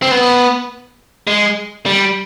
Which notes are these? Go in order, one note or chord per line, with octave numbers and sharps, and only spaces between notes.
C4
B3
G#3
G3